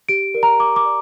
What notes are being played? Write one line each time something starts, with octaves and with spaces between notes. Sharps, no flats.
G4 D7
A#4 D5
A#5
G4 D6
D6
A#4 D5